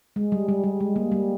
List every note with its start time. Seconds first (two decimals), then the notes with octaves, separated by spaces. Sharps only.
0.16 G#3
0.32 G3
0.49 G3
0.64 G3
0.80 G#3
0.96 G3 A#3
1.12 G3 A#3